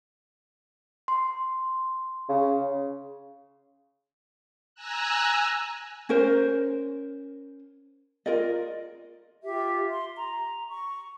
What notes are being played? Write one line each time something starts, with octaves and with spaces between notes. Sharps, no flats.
C6
C#3
G#5 A#5 E6 F#6
C#4 A#4 C5
F4 A#4 D5 D#5
F4 G4 E5
C6
A#5
C#6